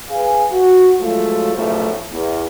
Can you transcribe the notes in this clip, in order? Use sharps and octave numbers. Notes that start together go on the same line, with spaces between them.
G#4 B4 F5 G#5
F#4
F3 F#3 G#3 A3 F4
B1 A2 C#3 F3 A3
E2